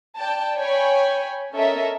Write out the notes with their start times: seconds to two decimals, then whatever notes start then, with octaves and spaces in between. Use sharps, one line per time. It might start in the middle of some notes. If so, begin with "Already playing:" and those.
0.18 D5 G5 A5
0.57 C#5 G5 G#5 B5
1.54 C#4 A4 A#4 D#5 E5